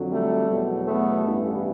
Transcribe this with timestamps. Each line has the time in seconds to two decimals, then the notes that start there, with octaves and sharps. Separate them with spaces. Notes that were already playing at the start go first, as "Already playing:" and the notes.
Already playing: F2 D3 F#3
0.11 G3 A3
0.49 E2 B2 F#3
0.87 A3 B3
1.26 A1 G2 E3